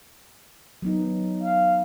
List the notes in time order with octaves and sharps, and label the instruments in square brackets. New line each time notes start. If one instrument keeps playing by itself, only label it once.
[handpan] F#3 B3 D#4
[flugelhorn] F5